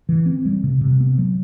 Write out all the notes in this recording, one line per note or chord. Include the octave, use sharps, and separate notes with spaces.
E3
C4
G3
C3
C3
B3
F#3